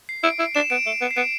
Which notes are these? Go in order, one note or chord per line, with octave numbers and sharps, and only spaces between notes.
C7
E4 D7
E4
D4 E7
B3 D7
A3
B3
C7
B3 D7